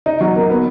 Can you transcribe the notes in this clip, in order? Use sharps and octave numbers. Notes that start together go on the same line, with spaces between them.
D#4
F#3
A#3
B3